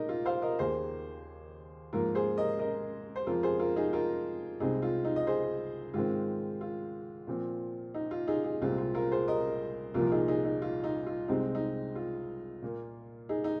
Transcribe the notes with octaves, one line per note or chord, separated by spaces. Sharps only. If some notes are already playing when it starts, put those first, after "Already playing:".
Already playing: A#2 G#3 D#4 A#4 D#5
F4
C5 F5
A#4 D#5
D#2 D#3 A#3 G#4 C5
G#2 F3 A#3 F4 A#4
G#4 C5
A#4 D#5
A#4 D#5
C5
F2 F3 G#3 F4 A#4
G#4 C5
F4 A#4
D#4 G#4
F4 A#4
C2 C3 G#3 C4 D#4 G#4
F4
D#4
D#5
G#4 C5
G#2 D#3 G#3 C4 F4
F4
A#2 F3 C4
D#4
F4
D#4 G#4
D#4 G#4
C2 A#2 G#3 C4 F4
F4
F4 A#4
G#4 C5
A#4 D#5
C2 A#2 F3 A#3 F4 A#4
A#4
D#4 G#4
D#4 G#4
D#4
F4
D#4
F4
C2 C3 G#3 C4 D#4
D#4
F4
A#2 A#3
D#4 G#4
D#4